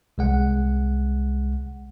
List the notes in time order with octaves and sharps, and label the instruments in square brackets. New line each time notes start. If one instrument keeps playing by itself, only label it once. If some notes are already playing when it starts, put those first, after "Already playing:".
[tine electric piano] C2 G#3 F#5